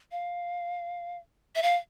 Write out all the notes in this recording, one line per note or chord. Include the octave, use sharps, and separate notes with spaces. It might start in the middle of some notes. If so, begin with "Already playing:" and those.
F5
E5
F5